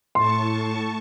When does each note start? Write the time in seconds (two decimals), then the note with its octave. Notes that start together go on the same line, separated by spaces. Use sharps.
0.15 A2 A5 C6 C#6